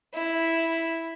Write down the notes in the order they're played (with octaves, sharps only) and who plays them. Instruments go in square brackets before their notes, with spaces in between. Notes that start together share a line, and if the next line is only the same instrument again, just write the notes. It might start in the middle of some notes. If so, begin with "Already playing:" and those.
[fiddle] E4